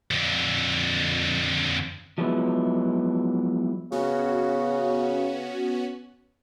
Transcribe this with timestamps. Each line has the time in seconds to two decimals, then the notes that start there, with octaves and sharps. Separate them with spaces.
0.11 F2 D3
2.18 F3 F#3 G#3 B3 E4
3.92 C#3 B3 C#4 F#4